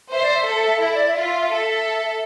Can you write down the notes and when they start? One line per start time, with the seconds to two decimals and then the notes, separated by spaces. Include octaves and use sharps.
0.12 C5 E5
0.22 D5
0.34 E5
0.46 A4
0.81 E4 E5
0.95 D5
1.08 E5
1.16 F4
1.50 A4 E5